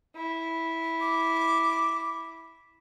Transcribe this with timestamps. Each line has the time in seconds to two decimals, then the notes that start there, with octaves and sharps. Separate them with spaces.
0.16 E4
1.01 D6